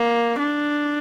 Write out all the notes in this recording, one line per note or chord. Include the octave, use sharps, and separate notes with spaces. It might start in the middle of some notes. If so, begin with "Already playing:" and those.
Already playing: A#3
D4